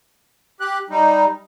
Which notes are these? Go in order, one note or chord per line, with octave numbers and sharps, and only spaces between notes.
G4 F#6
G3 D#4